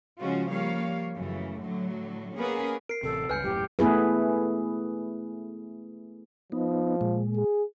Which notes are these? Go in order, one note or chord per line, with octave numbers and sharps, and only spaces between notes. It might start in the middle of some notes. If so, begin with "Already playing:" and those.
C#3 F3 G#3 C#4 F4 F#4
F3 G3 A#3 C#5 F5
F#2 C#3 E3 A3
A2 D3 F#3
A#3 B3 C#4 G#4 A#4 B4
A#4 C7 D7
A1 C3 A4
C#2 G2 B4 G#5 F6 G6 C#7
D#1 F#2 A2 G4
A3 B3 E4 G#4 B4
F3 B3 D#4
A#2 G#3
G#4